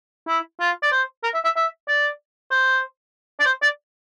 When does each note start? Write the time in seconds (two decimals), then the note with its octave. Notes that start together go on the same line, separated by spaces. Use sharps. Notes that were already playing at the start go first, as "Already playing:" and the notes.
0.28 E4
0.60 F4
0.83 D5
0.92 C5
1.23 A#4
1.34 E5
1.44 E5
1.56 E5
1.88 D5
2.51 C5
3.40 D5
3.46 C5
3.62 D5